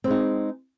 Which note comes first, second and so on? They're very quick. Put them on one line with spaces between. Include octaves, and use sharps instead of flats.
C4 G#3 D#4